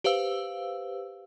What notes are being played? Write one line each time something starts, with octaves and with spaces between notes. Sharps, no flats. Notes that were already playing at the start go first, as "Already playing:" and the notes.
G4 B4 C5 F5 E6